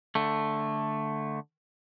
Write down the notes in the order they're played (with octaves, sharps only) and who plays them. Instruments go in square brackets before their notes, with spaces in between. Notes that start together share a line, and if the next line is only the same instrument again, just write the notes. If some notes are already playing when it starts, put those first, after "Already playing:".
[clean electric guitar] D3 A3